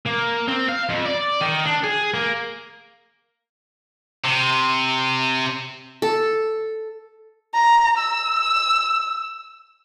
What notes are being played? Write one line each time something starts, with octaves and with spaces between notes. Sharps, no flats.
A#3
C4
F5
F2
D5
D#3
D4
G#4
A#3
C3
A4
A#5
E6